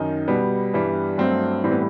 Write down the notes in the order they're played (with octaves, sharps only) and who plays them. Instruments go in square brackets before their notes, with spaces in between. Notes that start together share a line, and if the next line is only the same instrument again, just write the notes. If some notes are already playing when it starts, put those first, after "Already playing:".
Already playing: [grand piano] F#2 D#3 D#4
B2 G3 B3
G2 E3 G3
G2 F#3 A3 C4
A2 E3 G3 C4
B3